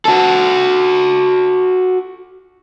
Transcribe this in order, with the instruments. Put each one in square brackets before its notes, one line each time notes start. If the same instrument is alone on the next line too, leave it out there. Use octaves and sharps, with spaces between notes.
[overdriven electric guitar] F#4 A4